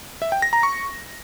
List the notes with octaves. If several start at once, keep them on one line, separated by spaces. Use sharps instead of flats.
E5
G5
A#6
A#5
C#6